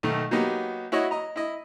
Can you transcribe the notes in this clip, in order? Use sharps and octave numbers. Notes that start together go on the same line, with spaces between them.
B1 D#3 A3
F#3 A#3 B3 D#4 G4
E4 F#4 C#5 D#5
D#5 A#5
E4 D#5